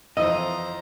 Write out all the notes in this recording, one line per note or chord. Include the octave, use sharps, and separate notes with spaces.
F2 E3 C5 D#5 A#5 E6